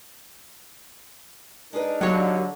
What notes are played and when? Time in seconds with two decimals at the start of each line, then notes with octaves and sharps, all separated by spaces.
1.73 G#3 D4 D#4 G#4 A#4 B4
2.01 D3 F#3 G4 C#5 F5 F#5